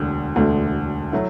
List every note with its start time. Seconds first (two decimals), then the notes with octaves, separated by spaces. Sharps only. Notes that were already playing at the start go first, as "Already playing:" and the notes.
Already playing: E1 D2 D3
0.36 E1 D2 D3 A3
1.12 F#3 A3 E4